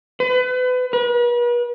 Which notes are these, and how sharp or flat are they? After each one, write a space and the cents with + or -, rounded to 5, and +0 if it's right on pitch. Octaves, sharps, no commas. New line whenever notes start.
B4 +30
B4 -40